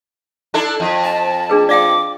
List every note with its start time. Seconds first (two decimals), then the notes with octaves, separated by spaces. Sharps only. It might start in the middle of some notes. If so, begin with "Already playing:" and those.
0.54 D4 E4 A4
0.80 F2
1.04 G#5 A5
1.50 D4 G#4 B4
1.69 D5 F5 G5 D6